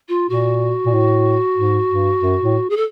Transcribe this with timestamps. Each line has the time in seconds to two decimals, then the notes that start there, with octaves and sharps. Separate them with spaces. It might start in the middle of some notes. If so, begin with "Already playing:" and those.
0.08 F4
0.29 A#2 F#4
0.86 A#2
0.93 A2
1.57 G#2
1.89 G2
2.21 F#2
2.42 A2
2.70 G#4
2.76 A4